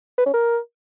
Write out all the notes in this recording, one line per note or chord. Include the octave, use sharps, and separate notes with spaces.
B4
C#4
A#4